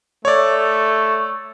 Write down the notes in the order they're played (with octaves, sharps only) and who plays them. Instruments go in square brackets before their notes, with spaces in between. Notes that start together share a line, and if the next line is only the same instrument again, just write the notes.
[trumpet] A3 [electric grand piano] C#5 D5